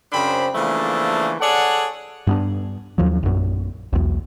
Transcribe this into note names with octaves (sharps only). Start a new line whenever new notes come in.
F#2 C#3 C4 D4 C5 B5
C#3 E3 F3 A3 A#3 D4
G#4 A4 C#5 D5 F#5
G2 B3 D4
D#2 F3 F#3
A#1 F#2
B1 E2